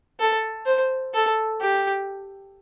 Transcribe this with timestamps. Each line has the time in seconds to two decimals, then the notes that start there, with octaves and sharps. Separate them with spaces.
0.20 A4
0.66 C5
1.14 A4
1.61 G4